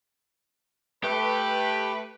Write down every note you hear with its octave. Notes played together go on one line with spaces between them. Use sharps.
A3 G4 B4